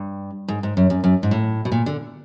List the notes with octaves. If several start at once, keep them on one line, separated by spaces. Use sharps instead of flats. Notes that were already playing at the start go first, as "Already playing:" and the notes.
Already playing: G2
G#2
G#2
F#2
F#2
F#2
G#2
A2
B2
A#2
D3